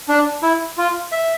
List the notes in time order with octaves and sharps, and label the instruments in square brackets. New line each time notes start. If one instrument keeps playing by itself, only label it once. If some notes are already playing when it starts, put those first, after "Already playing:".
[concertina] D4
E4
F4
E5